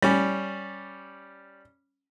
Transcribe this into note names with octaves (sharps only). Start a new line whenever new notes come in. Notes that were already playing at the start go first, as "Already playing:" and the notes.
G3 C#4